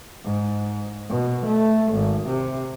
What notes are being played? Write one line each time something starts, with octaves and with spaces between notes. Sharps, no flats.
G#2
B2
A3
G#1
C3